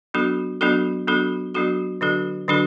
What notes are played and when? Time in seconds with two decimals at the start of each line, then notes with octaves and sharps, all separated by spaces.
0.14 F#3 B3 D4 F#4 A4
0.61 F#3 B3 D4 F#4 A4
1.08 F#3 B3 D4 F#4 A4
1.54 F#3 B3 D4 F#4 A4
2.01 D3 F#3 D4 F#4 A4
2.48 D3 F#3 D4 F#4 A4